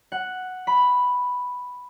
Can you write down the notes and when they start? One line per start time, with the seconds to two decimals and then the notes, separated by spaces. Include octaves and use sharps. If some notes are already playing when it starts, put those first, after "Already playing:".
0.12 F#5
0.67 B5